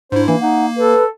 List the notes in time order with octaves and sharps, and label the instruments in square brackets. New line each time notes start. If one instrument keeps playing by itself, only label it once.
[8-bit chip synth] G#2 E4 [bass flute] D4 [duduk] C5
[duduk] E3 [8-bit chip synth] A#3
[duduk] D#4 [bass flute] F#5
[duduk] A4 [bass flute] B4